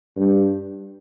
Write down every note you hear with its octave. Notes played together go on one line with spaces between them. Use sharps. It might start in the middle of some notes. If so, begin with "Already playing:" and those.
G2